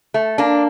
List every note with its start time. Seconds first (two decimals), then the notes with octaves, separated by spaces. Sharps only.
0.14 A3
0.38 A#3 D4